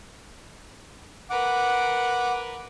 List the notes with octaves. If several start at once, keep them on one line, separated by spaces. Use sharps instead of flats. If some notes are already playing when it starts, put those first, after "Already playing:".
A#4 B4 F#5 D6